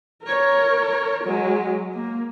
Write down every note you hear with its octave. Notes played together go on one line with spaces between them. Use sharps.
A#4 C#5
F#3 G#3
A#3